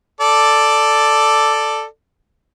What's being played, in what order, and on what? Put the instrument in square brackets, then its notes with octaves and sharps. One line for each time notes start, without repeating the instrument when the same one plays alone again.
[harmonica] A4 D5